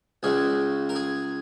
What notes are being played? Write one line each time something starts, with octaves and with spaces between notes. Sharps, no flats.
C#2 C#3 G#3 G#4
A#4
G#4